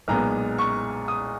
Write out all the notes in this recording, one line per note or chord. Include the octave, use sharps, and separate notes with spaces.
B1 A#2 G#3 B3 A#5
C#6
D#6